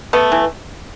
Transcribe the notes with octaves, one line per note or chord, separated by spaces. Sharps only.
A3 B3
E3